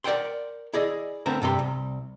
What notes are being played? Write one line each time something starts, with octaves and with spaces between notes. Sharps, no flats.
A#4 D5 F#5 G5 C6
E4 G#4 D5 D#5
D3 A3 B3 C4 A#4
G2 C3 G3 C6
C2